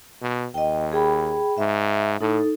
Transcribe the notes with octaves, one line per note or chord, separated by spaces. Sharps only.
B2
D#2 D#5 G5
G#4 G5 B5
G#2 E5
A2 D#4 A4